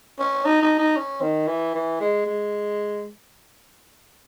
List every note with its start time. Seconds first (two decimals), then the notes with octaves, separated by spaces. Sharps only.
0.20 C#4
0.45 D#4
0.62 D#4
0.79 D#4
0.96 C#4
1.22 D#3
1.48 E3
1.75 E3
2.00 G#3
2.26 G#3